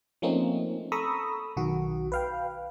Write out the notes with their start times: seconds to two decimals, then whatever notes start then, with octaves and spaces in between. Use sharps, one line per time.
0.22 F3 A3 A#3 C4 C#4 D#4
0.92 A4 A#5 B5 C#6 D#6 E6
1.57 B1 D#3 F#4
2.12 B4 F5 G5